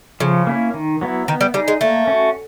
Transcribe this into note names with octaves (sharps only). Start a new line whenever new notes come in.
C#3 F3
A#3 C#4 E4
D#3
F#3 B3 E4
D#3 B3
G3
G3 D#4 G#4
G#3
A3 A#3
C#4 F#4